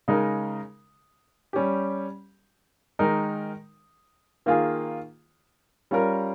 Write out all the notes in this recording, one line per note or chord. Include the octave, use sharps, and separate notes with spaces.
C#3 G#3 D#4 A#4
G3 C#4 G4
D#3 G#3 D#4 A#4
D#3 A#3 F4 G#4
G3 C#4 F4 A#4